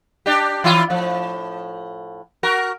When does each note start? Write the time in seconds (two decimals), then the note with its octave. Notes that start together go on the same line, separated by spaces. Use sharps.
0.26 D4 G4
0.64 E3 E4 F4
0.90 A2 F3
2.43 F#4 A#4